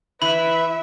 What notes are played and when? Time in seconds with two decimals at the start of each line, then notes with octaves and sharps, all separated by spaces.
0.22 E3 B4 E5 B5